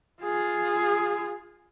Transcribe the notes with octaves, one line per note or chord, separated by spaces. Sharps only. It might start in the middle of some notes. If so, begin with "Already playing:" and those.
F4 G#4